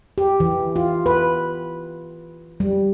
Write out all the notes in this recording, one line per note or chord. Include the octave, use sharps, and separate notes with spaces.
G4
E3
F4
B4
G3